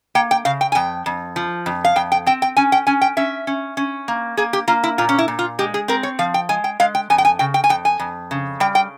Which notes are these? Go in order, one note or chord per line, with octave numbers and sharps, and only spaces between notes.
A#3 G5
G5
C#3 F5
G5
G#5
F2 G5
F2
F3
F2
F5
F2 G5
G5
C4 G5
G5
C#4 G#5
G5
C#4 G#5
G5
C#4 E5
C#4
C#4
A#3
A#3 G#4
G4
A#3 F4
E4
A#2 F4
C#4
E4
A#2
F4
G#3 G4
G#4
C4 A#4
C#5
F3 F5
G5
G#3 G#5
G5
G#3 F5
G5
F2 G#5
G5
G#5
C#3 G5
G5
G#5
F2 G5
G#5
F2
C#3
G3 G5
G5